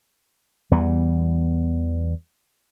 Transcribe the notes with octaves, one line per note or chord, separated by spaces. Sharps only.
E2 E3 G3 B3